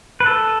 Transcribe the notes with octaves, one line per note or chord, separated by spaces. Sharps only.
B4
A4